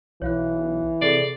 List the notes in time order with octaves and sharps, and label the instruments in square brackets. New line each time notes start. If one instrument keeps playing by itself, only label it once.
[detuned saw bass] B1 [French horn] E3 [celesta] C#5 F5 F#6
[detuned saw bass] C3 [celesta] G#4 A4 C7 [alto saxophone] D5